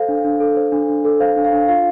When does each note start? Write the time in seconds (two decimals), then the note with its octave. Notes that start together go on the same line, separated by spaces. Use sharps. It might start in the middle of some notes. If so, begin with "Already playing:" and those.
Already playing: A4 C5 F5
0.09 D4
0.25 D4
0.40 A4
0.57 C5
0.72 D4
0.89 D4
1.05 A4
1.20 C5 F5
1.36 D4
1.44 F5
1.53 D4
1.68 F4 F5